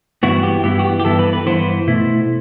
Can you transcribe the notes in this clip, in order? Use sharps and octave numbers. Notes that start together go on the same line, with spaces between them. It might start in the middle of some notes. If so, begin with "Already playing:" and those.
G2 E3 B3 E4 F#4
G4
G2 E3 B3 E4 G4
F#4
G4
G4
G2 E3 B3 E4 A4
B4
B4
G2 E3 B3 E4 C5
B2 A3 E4